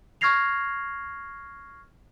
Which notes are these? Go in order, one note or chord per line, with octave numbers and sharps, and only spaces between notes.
C#6 F6 G#6 A#6 C7 F7